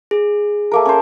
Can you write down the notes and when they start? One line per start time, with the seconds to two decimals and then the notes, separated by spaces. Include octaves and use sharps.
0.11 G#4
0.71 A3 A#3 A#4
0.86 C#4 C5